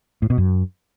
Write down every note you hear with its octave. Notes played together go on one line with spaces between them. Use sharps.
A2
B2
F#2